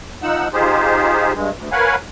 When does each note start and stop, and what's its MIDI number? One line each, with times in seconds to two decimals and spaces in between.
0.22 0.48 53
0.22 0.48 63
0.22 0.48 78
0.22 0.48 88
0.53 1.32 63
0.53 1.32 65
0.53 1.32 67
0.53 1.32 68
0.53 1.32 72
1.34 1.50 43
1.34 1.50 56
1.57 1.69 38
1.72 1.95 70
1.72 1.95 71
1.72 1.95 73
1.72 1.95 77
1.72 1.95 78
1.72 1.95 80